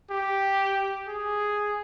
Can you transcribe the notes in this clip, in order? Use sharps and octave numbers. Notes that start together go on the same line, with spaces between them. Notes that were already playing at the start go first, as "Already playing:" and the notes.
G4
G#4